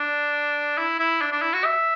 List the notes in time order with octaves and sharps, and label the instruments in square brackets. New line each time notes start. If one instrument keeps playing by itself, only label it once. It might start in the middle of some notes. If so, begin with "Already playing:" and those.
Already playing: [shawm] D4
E4
E4
D4
D4
E4
F#4
E5